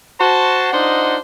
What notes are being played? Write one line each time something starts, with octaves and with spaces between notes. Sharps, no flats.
F#4 C5 A5
D4 D#4 F4 C5 D#5 F#5